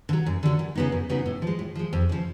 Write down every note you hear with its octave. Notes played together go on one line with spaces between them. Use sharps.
D3
F#3
F#2
D3 F#3
F#2
C#3 F#3 B3 D#4
F#2
C#3 F#3 B3 D#4
A2
F3 G#3
A2
F3 G#3
F2
C#3 F3